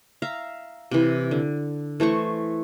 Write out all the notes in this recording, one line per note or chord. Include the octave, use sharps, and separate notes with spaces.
E5 F5 A#5
C3 E3
D3
E3 A3 C5 C#6